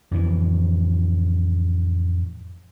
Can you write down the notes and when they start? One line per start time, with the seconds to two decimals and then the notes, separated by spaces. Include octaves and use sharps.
0.11 F2 A2 E3